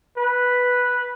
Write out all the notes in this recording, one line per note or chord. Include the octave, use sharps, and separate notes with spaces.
B4